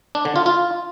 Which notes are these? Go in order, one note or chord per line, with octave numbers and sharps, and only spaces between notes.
D4
D3
F4
F4